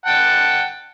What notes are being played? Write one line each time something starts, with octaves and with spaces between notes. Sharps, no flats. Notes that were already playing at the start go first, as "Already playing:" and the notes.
F#5 G5 A5